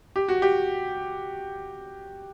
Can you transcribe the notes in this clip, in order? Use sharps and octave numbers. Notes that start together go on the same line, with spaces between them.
G4
F#4
G4